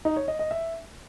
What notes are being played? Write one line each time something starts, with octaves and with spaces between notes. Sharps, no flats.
D#4
C#5
D#5
D#5
E5